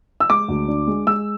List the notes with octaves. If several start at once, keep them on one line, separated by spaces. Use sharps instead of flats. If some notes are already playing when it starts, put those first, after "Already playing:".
E6
G#3 D6
D2
D4
G#3
G#3 E6